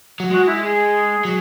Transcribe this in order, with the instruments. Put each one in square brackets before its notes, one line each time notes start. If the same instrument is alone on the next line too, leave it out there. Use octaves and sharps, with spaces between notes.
[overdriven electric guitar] F#3
[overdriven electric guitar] G#3 [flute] F#4
[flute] E4
G#4
[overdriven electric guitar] F#3